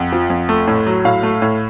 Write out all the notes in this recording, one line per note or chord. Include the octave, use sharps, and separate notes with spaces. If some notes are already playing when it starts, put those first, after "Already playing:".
Already playing: F2 F#5
F3
F2
A3
A2
F#3
A2 F5
A3
A2